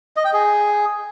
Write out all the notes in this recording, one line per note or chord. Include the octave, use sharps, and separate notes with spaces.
D#5
G5
G#4